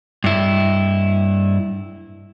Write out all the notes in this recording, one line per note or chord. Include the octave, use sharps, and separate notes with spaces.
G2 E4